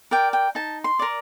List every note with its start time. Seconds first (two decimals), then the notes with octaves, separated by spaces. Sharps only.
0.11 A#4 D5 G5
0.33 G5
0.55 D#4 A5
0.84 C6
0.99 A#4 D5